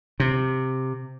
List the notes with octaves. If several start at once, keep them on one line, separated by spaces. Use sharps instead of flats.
C3